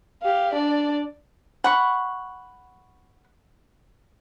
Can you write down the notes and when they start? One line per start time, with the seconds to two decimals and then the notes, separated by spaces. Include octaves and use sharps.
0.23 G4 F5
0.53 D4 D5
1.64 F#5 B5 C#6